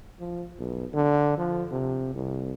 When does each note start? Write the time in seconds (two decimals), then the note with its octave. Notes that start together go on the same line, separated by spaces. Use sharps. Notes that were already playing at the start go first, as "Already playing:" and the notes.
0.20 F3
0.59 B1
0.94 D3
1.38 F3
1.71 C3
2.14 C2